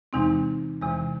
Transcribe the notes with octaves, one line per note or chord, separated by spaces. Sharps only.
E2 C3 E3 G#3 C4 D#4
E2 C3 E3 G#3